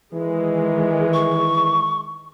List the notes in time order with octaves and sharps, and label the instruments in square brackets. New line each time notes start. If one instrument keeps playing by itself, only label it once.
[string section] D#3 G#3 [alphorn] E3
[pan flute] C#6